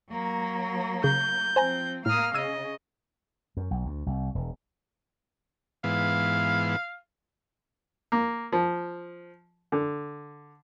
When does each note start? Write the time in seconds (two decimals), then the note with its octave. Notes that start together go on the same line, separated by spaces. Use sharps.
0.10 F#3 A#3
1.04 C#3 G6
1.56 F3 C4 C5 G#5 A#5
2.06 A2 A#3 F5 D#6 F6
2.34 C#3 D#5 E6 G#6 D#7
3.57 F#2
3.71 B1
3.85 D2
4.06 C2
4.35 E1
5.84 G#2 E3 B3 F5
8.12 A#3
8.52 F3
9.72 D3